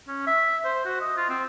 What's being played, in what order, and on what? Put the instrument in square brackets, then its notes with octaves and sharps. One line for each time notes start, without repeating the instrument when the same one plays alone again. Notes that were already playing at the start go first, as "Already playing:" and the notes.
[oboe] C#4
E5
C5
F#4
D#5
F4
C4